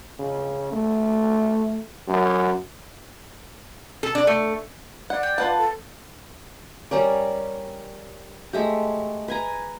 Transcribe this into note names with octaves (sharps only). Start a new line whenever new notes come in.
C#3
A3
F#2
A4
D4
A3
D5 F#5
G5
F4 B4 F#5 A5
A4
G3 C#4 A#4 D5
G#3 A3 G4
B4 G#5 A#5